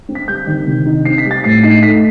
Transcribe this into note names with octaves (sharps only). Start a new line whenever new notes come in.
C4
B6
G3 G6
D#3
C3
D#4
C4 C7
B6
G3
A6
A2 C7
D#4 C7
A3 B6